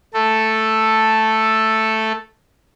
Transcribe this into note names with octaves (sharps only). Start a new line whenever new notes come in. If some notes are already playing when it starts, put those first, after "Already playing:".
A3 A4